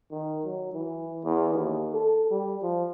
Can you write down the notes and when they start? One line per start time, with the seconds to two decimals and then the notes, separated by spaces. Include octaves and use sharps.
0.11 D#3
0.44 F#3
0.73 E3
1.24 E2
1.53 D#2
1.93 A4
2.31 G3
2.62 F3